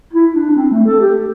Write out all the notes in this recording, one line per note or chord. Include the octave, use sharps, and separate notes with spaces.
E4
D4
D4
C4
A3
A4
G4